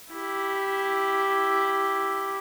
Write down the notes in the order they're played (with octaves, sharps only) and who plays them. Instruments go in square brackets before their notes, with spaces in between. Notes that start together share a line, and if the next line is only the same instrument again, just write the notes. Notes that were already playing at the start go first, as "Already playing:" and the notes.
[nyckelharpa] E4 G4